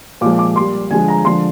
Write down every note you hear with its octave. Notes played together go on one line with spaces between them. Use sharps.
A#2 F3 G#3 D6
D6
A#2 G3 C6
D3 F3 G#3 G#5
A#5
D3 F3 G#3 C6